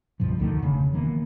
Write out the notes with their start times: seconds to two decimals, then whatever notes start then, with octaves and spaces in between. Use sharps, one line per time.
0.20 C#2 G2 B2 F3
0.39 D2 D3 D#3 A3
0.62 E1 C#3
0.93 D#3 E3 A#3 B3